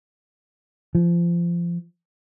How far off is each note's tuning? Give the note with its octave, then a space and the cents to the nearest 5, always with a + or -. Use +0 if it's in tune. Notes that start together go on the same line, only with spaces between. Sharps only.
F3 -25